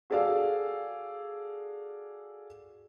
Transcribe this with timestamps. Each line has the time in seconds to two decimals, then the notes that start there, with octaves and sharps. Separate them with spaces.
0.10 F#4 G#4 A4 D5 F5 E6